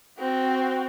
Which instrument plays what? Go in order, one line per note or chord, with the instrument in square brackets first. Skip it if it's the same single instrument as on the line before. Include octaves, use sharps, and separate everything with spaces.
[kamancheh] C4 F#4